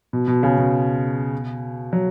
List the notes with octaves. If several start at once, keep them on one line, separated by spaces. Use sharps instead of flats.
B2
B2
C#3
B2
F#3